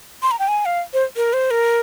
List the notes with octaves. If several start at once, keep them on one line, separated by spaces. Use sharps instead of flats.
C6
A#5
G5
G#5
F5
C5
A#4
C5
A#4